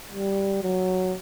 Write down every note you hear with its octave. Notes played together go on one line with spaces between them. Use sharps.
G3
F#3